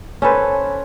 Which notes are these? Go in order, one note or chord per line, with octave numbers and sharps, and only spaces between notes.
C#4 A4 B4 C5